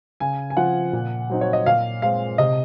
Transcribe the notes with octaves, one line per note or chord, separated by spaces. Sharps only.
C#3 G#5
G#5
F3 C4 F4 F#5
A#2
F#3 C4 D#4
C#5
D#5
A#2 F5
G#3 C4 F5
C3 D#5